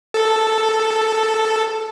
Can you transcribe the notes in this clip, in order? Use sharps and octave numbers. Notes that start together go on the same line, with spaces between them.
A4